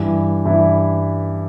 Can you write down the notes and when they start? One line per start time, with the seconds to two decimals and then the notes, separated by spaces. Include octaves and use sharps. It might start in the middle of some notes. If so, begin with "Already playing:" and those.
Already playing: G2 E3
0.45 G2 E3 E4